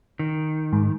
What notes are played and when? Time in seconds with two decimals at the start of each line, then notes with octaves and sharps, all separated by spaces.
0.19 D#3
0.73 G#2